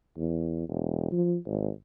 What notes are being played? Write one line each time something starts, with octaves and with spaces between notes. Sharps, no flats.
E2
E1
F3
G#1